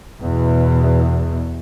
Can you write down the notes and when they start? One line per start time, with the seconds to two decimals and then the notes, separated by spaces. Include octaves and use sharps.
0.21 E2 B2